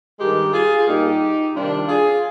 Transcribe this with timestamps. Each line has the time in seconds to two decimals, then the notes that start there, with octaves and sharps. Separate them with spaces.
0.19 G2 D#3 G#3 G4 A#4
0.53 F4 G#4
0.87 A#2 G3 A#3 D#4 G4
1.55 C3 D#3 G3 D4 F4
1.89 F4 G#4